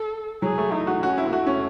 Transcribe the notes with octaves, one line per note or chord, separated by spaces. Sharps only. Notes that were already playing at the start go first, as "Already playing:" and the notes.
Already playing: A4
F#3 G#4
A3
D#4 E4
F#4
C#4 F#4
E4
A3 F#4
C#4